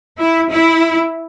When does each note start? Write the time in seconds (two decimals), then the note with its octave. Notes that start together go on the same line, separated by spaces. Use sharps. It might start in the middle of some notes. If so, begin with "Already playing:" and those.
0.18 E4
0.50 E4